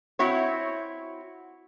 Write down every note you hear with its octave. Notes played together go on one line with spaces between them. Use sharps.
C4 E4 F#4 C#5